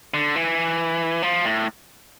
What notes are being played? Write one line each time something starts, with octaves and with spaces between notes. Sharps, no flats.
D3
E3
F3
A2